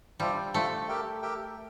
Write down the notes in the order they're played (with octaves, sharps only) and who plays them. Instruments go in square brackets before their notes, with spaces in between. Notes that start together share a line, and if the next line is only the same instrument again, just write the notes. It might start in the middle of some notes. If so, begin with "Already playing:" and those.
[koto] G3 [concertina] D4 F4 C5 E5 G5
[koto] A3 [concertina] D4 F4 C5 E5 G5
[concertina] G4 A#4 E5 G5
G4 A#4 E5 G5